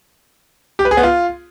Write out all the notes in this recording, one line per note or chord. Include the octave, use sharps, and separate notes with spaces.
G4
B4
G#4
B3
F4